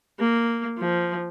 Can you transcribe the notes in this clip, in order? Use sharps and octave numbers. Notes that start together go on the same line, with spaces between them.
A#3
F3